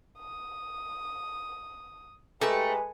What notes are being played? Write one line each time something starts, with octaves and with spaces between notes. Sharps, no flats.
D#6
G#3 A3 G4 A#4 B4 G#5 E6